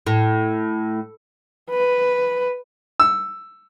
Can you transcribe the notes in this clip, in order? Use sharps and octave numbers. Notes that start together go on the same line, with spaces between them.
A2
B4
E6